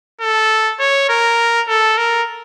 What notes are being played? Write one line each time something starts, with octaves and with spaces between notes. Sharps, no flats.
A4
C#5
A#4
A4
A#4